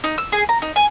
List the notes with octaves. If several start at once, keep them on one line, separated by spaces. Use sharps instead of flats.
D#4
E6
G#4
A#5
D#4
G#5